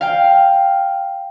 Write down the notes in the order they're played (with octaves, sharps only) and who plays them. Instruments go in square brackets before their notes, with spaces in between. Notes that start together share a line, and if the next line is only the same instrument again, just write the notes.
[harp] F5 G5